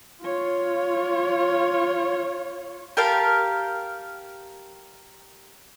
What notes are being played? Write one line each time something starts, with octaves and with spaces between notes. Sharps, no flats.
F4 C#5
G4 A#4 F5 A5